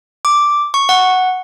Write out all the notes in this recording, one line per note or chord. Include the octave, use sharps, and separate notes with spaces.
D6
C#6
F#5